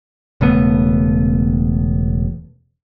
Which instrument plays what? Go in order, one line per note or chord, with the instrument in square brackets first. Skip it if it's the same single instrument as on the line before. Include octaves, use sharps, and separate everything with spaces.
[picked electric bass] E1 C#3 A3 B3